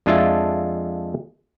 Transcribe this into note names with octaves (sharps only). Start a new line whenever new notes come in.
F2 G#3 D4 F4 E5 A5